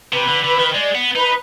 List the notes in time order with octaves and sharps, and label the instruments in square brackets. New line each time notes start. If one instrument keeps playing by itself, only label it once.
[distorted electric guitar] C3 [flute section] B4
[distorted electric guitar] D3
D3
D#3
[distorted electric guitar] G#3 [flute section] D5
[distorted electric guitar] B3
[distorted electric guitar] D#4 [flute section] B4